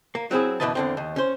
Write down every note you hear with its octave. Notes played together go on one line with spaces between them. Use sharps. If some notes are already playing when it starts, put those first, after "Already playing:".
A#3
F#3 C4 E4 G#4
F#2 B2 E3 B4 D#5 A5
E2 D3 C4
D#2
C#4 C5